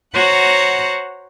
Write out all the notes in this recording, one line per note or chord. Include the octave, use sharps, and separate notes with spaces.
F#4 C5 C#5 F#5 A#5